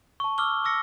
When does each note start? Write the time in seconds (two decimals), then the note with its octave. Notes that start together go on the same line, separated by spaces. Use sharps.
0.20 A5 C#6
0.38 D6 E6 F6 G7
0.64 C#6 D6 E6 A#6 C#7